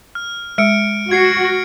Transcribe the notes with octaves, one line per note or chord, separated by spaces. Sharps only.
F6
G#3 F6 C#7 D7
F#4 G#6 C7 C#7